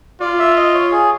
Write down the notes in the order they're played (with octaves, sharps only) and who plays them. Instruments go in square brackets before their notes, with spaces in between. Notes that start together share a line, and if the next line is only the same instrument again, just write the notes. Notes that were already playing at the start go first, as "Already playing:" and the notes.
[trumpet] F4 [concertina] D5
[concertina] E5
D#5
C#5
G#4